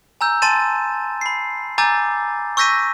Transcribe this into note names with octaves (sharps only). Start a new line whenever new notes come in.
G#5 A#5 E6 G6
G#5 A5 C6 A6 D#7 E7
B5 C7
G#5 A#5 D6 E6 G6 A6
C#6 E6 G6 A#6 B6 D#7